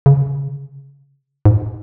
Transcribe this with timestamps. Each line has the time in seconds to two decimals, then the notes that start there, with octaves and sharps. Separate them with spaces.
0.06 C#3
1.45 G#2